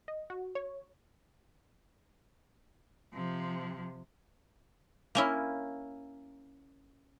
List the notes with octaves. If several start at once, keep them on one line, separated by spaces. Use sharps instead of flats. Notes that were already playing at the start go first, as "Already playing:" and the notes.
D#5
F#4
C#5
C3 F3
A#3 C#4 E4